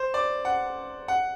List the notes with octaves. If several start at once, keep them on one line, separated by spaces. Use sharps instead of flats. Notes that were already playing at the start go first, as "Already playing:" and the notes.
Already playing: C5
D5
F#5
F#5